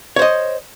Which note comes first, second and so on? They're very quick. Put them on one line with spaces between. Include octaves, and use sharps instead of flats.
C#5 C5 D#5